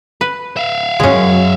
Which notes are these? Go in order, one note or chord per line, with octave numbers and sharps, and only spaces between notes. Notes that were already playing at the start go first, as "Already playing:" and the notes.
B4
E5 F5
F#2 G#3 C#4